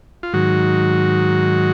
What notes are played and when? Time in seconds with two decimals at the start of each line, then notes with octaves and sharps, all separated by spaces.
0.23 F4
0.33 G#2 D#3 F#3 F#4